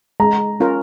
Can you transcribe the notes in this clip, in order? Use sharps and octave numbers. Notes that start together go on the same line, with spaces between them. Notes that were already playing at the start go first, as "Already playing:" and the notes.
G#3 A#5
C#4 F4 A#4